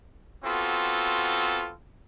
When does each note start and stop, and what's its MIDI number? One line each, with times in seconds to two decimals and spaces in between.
0.44 1.73 59
0.44 1.73 60
0.44 1.73 65
0.44 1.73 66
0.44 1.73 69